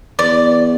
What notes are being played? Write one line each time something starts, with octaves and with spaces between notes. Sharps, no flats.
E2 D5